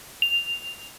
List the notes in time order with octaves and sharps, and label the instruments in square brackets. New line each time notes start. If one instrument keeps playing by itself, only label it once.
[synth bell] F7